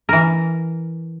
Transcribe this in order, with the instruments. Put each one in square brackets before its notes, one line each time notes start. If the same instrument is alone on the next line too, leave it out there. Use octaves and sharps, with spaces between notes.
[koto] E3 A#4